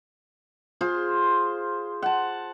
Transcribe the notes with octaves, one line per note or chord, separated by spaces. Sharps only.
F4 G#4 C5
F#5 A5